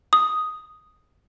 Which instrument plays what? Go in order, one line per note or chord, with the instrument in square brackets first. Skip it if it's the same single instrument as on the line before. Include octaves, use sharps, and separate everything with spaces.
[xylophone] D#6